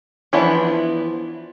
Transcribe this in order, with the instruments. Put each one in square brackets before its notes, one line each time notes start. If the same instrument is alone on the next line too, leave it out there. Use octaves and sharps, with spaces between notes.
[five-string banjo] E3 F3 B3 D4 E4